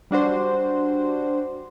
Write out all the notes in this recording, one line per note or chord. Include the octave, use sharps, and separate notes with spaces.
G3 D4 F#4 C5